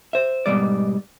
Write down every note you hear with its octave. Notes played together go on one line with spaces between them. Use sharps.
C5 E5
G#2 B2 G3 D5